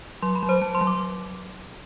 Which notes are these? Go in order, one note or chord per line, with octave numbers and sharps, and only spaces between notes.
F#3 C6
B5
F#3
C5
F#3 A5
C6
F#3
D6